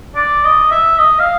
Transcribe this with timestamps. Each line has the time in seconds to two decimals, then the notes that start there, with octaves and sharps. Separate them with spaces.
0.15 D5
0.44 D#5
0.71 E5
0.98 D#5
1.19 F5